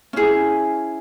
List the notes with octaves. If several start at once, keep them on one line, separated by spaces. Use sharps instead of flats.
C#4 E4 G#4